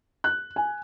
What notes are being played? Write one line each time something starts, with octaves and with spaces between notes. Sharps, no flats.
F#6
G#5